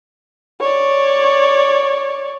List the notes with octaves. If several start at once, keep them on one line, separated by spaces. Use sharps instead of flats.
C#5 D5